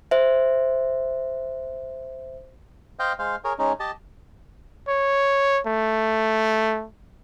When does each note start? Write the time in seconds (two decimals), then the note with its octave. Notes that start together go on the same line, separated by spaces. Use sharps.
0.11 C5 E5
2.99 C5 D#5 F5 G5
3.19 G#3 C5 F5
3.44 G#4 A#4 C#5
3.59 G#3 C#4 D#4
3.80 G4 D#5 A5
4.88 C#5
5.67 A3